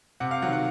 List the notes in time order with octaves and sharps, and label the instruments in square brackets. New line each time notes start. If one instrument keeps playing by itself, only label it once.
[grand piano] C3 F#5
F5
D#3 F#3 F#5
F#5